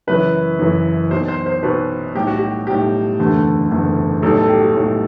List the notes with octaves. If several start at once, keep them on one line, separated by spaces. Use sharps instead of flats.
F#1 F#2 E3 B4
F#1 F#2 E3
B1 B2 F#3 C5
C5
C5
B1 B2 F#3 B4
B1 A2 G3 G4
F#4
G4
B1 A2 G3 G4
F#1 E2 D3 A3
F#1 E2 D3 A3
B1 A2 G3 A4
A4
G4
F#4
B1 A2 G3